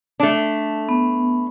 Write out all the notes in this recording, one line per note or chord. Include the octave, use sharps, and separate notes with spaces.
A3 D4
B3